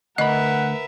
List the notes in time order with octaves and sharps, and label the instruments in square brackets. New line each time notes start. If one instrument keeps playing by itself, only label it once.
[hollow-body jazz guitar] D2 B5 [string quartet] A#4 B4 E5 [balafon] D#5 [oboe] F#5